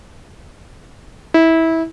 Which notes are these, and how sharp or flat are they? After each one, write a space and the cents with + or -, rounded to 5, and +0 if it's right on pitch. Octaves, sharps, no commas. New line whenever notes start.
E4 -20